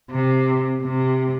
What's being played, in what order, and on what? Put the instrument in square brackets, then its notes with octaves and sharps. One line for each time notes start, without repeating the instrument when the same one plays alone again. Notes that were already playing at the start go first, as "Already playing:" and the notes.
[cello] C3
C3